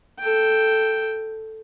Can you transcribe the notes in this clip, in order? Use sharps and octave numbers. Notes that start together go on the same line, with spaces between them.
A4 G5